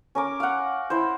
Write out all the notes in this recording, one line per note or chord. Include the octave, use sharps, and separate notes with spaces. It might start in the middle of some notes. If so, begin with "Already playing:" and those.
C#4 A#4 D6
F5 F#5
E4 C5